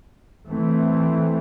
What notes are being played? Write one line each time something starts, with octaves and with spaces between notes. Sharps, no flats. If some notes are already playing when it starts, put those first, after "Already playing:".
E3 A3 C4